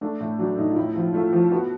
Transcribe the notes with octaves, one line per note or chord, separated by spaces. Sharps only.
A3 D4
A2
F#3 D4
A2 D#4
F4
A2 E4
F3 F4
A3 F4
F3 F4
B3 F#4